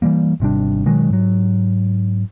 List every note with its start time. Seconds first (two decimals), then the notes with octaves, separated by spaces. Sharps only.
0.02 E3 F3 G3 A#3
0.40 G#1 C3 G3 D4
0.86 B2 D#3 F#3 G#3
1.10 G#2 F#3